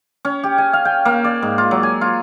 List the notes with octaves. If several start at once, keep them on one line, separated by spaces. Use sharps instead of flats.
C#4
G4
G#5
F5
G5
A#3
D5
G#2
F4
F#3
G#5
F4